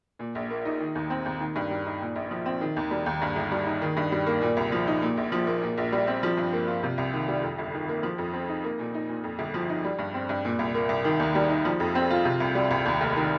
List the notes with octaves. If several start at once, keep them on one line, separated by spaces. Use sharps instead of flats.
A#2
A#1
A#3
D#4
D#3
D#2
C4
D#2
D#3
G2
G3
D#4
A#2
A#1
F3
C4
D#3
D#2
G3
D#2
G2
G1
G3
D#4
D#3
G2
G3
A#3
A#2
C2
F3
D#4
A#2
A#1
F3
A#3
A#2
A#1
G3
C4
F3
G2
A#3
F4
C3
C2
D#3
G3
F2
G1
D#3
A#3
F3
F2
C4
D#4
A#3
A#2
D#4
A#2
F2
G1
F3
D#4
G3
G2
C4
G2
A#2
C2
A#3
C2
D#3
D#2
G3
D#4
F3
F2
C4
F4
C3
C2
G3
C2
D#2
F1
D#3